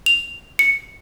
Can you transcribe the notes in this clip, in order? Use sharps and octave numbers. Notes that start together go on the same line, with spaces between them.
F7
C#7